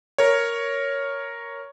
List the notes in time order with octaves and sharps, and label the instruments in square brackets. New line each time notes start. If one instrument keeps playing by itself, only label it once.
[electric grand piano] A#4 C#5